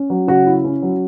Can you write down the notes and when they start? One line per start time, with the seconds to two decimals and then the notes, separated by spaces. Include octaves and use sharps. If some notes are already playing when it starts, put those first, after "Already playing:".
Already playing: C#4
0.10 F#3
0.28 C#3 F#4
0.46 E4
0.64 C#4
0.82 F#3